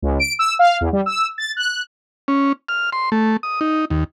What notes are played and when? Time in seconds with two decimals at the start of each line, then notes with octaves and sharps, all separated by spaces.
0.02 C#2
0.19 D7
0.39 E6
0.59 F5
0.81 E2
0.93 G3
1.06 E6
1.38 A6
1.57 F#6
2.28 C#4
2.69 F6
2.93 C6
3.12 A3
3.43 D#6
3.61 D#4
3.90 D#2